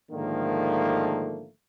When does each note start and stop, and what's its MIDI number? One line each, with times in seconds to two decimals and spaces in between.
0.11 1.49 44
0.11 1.49 50
0.11 1.49 51
0.11 1.49 53
0.11 1.49 57
0.11 1.49 58